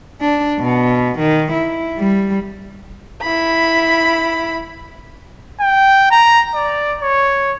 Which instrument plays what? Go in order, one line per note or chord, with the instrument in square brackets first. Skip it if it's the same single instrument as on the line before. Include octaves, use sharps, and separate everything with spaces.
[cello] D4
B2
D#3
E4
G3
[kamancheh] E4 B5
[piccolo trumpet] G5
A#5
D5
C#5